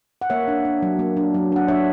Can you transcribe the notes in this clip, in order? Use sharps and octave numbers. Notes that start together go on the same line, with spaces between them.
F#5
A#3 C#5 E5
D4
D4
F#3
A#3
D4
F#3
D4 F#5
D4 C#5 E5